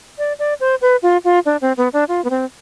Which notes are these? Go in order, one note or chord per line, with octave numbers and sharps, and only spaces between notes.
D5
D5
C5
B4
F4
F4
D4
C4
B3
D4
F4
B3
C4